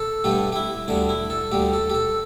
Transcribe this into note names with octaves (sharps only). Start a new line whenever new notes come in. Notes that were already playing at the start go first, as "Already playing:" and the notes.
Already playing: A4
G2 D3 A3 G4
G4
E4
D2 D3 G3 D4
E4
A4
D2 D3 G3 G4
A4
G4
A4